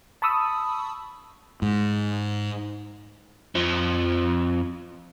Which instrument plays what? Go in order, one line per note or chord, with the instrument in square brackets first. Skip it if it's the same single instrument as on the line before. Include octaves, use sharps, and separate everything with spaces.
[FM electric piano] A5 B5 C#6 D#6 E6
[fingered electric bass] G#2
[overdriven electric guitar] F2 F3